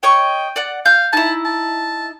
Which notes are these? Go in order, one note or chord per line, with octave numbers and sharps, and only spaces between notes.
C#5 D#5 G5 C#6
D5 F#5
F5 G6
D#4 E4 A5
A5